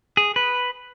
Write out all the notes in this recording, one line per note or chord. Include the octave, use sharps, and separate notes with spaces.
G#4
B4